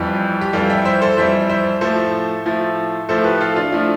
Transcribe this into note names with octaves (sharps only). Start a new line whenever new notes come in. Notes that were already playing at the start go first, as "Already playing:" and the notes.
Already playing: F2 E3 G3 G4 B4
G4
F2 E3 G3 F4 A4
E5 G5
C5 E5
A4 C5
F2 E3 G3 C5 E5
C5 E5
A2 F3 A3 A4 C5
A2 F3 A3
A2 F3 A3 A4 C5
G4 B4
F4 A4
D4 F4
A2 F3 A3 D4